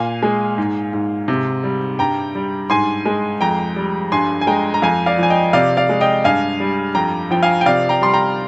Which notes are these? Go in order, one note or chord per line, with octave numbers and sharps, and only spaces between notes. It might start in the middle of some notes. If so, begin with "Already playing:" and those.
Already playing: A#2 F5 G#5
G#3
G#2
G#2
C3
G3
G2 G5 A#5
G3
G#2 G#5 C6
G#3
F2 G5 A#5
G3
G2 G#5 C6
G#5
G#3 G5 A#5
A#5
F2 F5 G#5
D5 F5
F3 G#5
D#5 G5
C3 D5 F5
D5 F5
G#3
D#5 G5
G2 F5 G#5
G3
F2 G5 A#5
F3 G5
F5 G#5
G5
C3 D5 F5
G5 A#5
G3 C6
G5 A#5